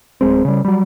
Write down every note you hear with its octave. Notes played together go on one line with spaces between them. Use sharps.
D1 G#3 C4
C#3 G3
F#3 G3